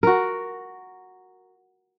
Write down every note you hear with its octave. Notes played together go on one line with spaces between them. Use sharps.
F#4 A#4